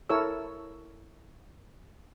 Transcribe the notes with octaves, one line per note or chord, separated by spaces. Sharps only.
E4 A4 A#4 C#5 E6